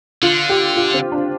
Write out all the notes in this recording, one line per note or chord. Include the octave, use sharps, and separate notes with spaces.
D3 F4
G4
F4
C4
D4